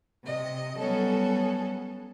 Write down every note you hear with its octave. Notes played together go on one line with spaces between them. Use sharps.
C3 D#5
F#3 G3 B3 C#4 A4